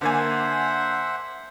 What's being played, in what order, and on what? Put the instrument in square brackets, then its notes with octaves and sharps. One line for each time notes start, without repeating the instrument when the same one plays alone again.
[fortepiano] D3 A#3 G#5 [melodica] C5 E5 F#5